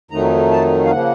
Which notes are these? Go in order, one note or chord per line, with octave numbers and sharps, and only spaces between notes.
F2 D#3 F#3 A3 D#4 A#5
A5
F5
C#3 F3 A#3 F#5